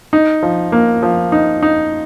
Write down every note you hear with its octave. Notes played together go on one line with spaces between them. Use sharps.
D#4
F3
A#3
F3
D#4
D#4